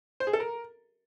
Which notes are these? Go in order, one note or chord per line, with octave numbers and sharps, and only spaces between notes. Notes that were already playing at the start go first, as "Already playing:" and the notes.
C5
G#4
A4
A#4